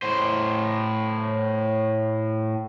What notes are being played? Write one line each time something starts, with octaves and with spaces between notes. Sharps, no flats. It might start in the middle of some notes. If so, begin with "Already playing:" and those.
A2 C5